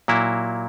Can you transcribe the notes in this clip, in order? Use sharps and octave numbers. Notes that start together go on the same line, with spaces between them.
A#2 F#3 A#3 E4